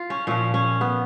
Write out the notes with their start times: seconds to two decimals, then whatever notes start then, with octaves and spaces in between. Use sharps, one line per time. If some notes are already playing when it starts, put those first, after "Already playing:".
Already playing: F4
0.10 C#4
0.27 A#2 F3 C#4
0.54 C#4
0.81 B3